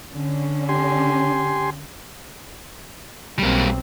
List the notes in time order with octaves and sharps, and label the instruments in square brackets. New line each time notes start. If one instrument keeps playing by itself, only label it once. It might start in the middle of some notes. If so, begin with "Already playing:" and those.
[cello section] D3 C#4
[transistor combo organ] G4 G#5 C6
[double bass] B1 C4 [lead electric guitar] G3 A#3